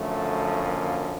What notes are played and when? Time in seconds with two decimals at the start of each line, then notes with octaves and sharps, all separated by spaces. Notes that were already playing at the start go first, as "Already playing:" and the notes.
Already playing: F#2 D3 F3 A3
0.64 A#3